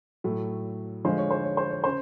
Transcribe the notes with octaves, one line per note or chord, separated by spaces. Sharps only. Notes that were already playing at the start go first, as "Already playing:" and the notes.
A2 F#3 A3
D3 F3 G#3 C5
C#5
C5
C#5
C5
C#5
C#3 C5